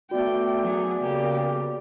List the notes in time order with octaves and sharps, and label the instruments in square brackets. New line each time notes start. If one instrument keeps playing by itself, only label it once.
[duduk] A3 [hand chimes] B3 F#4 [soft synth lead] D5 [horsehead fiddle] G5
[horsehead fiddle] F#3 G#4
[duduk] C#3 [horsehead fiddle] A#3 G4